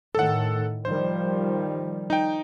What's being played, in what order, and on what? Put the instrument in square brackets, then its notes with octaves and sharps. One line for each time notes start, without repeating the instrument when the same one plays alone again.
[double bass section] A2 D#3 [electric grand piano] A4 F#5
[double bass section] D#3 F3 G3 [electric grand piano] C5
[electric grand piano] D#4 G5